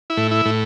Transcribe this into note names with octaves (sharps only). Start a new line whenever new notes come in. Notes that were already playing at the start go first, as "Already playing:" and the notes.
E4
A2
E4
A2